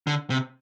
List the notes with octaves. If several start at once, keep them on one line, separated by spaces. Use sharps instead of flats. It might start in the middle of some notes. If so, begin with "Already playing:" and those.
D3
C3